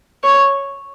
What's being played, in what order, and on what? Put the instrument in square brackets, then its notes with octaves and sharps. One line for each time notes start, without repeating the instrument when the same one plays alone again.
[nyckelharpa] C#5